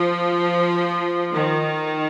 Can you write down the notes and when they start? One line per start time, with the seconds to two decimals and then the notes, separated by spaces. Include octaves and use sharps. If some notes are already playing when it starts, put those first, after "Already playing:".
Already playing: F3
1.33 D#3